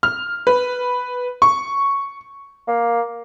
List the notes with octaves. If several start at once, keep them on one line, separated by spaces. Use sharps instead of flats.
F6
B4
C#6
A#3